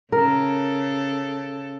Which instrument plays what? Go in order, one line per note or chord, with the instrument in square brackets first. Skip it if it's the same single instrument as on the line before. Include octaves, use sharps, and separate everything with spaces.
[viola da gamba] C#3 A4 [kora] A#4